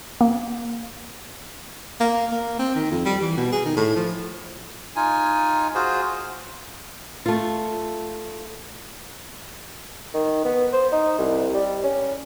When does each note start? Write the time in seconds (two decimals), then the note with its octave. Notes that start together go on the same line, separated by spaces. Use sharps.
0.21 A#3
2.00 A#3
2.32 A#3
2.59 C4
2.75 D#3
2.91 F2
3.05 G3
3.21 E3
3.37 B2
3.52 G#4
3.65 D#3
3.77 A2
3.96 F3
4.96 D#4 F4 G#5
5.75 F4 F#4 G#4 C5
7.26 A3 F4
10.14 D#3
10.45 B3
10.73 C5
10.92 D#4
11.19 C2
11.54 G3
11.83 C#4